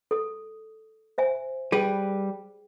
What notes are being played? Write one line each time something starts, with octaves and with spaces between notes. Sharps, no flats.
A4 D#6
C5 E5 G#5
G3 G#4 B4 G5